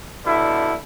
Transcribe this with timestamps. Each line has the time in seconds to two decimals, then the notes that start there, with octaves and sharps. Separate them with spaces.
0.24 B2 D3 G3 E4